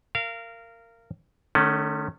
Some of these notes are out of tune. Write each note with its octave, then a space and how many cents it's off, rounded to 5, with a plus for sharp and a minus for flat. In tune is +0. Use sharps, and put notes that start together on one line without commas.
A#4 -15 F5 -25
D#3 -45 A3 -5 C#4 +5